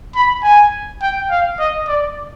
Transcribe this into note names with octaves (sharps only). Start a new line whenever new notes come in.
B5
G#5
G5
F5
D#5
D5